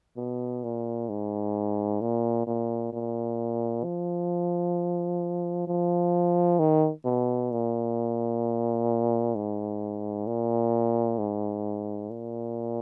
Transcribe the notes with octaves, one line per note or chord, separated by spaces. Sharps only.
B2
A#2
G#2
A#2
A#2
A#2
F3
F3
D#3
B2
A#2
G#2
A#2
G#2
A#2